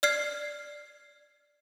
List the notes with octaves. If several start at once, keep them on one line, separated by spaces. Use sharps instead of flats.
D5 F6 G#6 C7